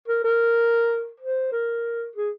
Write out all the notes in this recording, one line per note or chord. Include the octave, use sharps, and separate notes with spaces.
A#4
A#4
C5
A#4
G#4